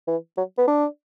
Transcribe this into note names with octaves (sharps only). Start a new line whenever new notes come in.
E3
F#3
B3
D4